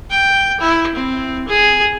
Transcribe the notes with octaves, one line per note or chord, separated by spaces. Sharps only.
G5
E4
C4
G#4